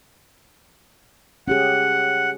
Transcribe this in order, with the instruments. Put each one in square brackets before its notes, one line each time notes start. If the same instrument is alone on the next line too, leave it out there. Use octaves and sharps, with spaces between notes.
[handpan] C#4 G4 G#4 [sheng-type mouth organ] F#5